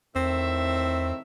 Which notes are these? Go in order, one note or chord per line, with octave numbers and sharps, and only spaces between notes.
E2 A2 D#3 C4 E5